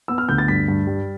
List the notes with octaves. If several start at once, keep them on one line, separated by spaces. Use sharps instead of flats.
B3 E6
F6
D2 G6
A6
G2 B6
G2
G3